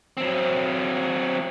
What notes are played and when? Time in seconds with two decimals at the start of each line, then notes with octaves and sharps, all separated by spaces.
0.17 F#3 C4